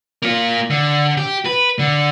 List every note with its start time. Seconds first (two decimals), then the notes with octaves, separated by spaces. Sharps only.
0.22 A#3 F4
0.70 D3
1.17 G4
1.45 B4
1.79 D3